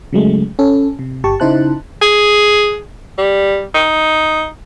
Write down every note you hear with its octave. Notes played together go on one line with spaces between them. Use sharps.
C#3 F#3 G#3 A3
C#4 A4
C3
G1 G4 A5 C#6
C#3 D#4 E4 C5 A5 F#6
G#4
G3
D#4